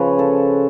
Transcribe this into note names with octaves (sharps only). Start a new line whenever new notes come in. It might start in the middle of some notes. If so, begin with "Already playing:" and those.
Already playing: C#3 F3 B4 C#5
A4